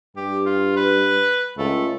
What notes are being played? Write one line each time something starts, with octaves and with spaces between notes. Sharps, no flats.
G2 G4
F4
B4
C#2 A3